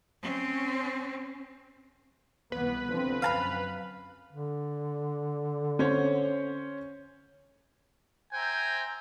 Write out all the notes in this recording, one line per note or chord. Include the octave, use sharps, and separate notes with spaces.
C4 C#4
C2 E3 B3 B4
D3 F3 C4
F#2 F5 A5 B5
D3
C#4 C5 C#5
C5 E5 G5 G#5 A#5